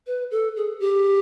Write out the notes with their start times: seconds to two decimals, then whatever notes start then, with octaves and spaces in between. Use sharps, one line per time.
0.07 B4
0.31 A4
0.56 G#4
0.80 G4